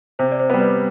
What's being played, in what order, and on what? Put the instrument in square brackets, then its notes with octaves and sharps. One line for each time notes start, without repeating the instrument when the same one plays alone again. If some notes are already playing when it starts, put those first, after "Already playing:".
[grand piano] C3 [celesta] C5
[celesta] D5
C5
[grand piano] G3 B3
[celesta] B4 D5